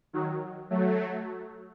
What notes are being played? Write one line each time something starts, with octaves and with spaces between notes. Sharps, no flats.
D#3 F#3
F#3 A3